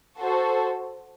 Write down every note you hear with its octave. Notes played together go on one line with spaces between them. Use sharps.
F#4 A4 C5